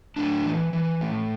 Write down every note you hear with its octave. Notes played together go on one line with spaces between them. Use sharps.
A2 D4
E3
E3
A2